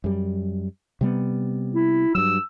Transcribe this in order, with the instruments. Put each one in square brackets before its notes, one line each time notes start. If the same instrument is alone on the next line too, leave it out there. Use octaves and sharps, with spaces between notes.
[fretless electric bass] F#2 G3
C3 G3 B3
[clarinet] E4
[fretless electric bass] G2 F#3 [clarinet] E6